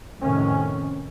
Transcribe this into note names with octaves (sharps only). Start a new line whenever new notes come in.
F2 A2 C3 D#3 C#4